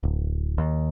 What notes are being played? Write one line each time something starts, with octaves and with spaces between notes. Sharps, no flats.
D1
D#2